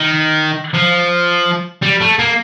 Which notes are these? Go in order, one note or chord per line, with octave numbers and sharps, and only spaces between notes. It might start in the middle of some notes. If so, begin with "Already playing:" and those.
Already playing: D#3
F3
G3
A3
A#3